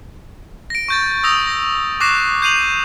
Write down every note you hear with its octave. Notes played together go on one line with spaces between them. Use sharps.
A#6 D7
C#6 G6 A6
D#6 E6 A#6 F7
A#6
C#6 D6 F#6 A#6 C7 E7
G6 C7 D#7 F7 F#7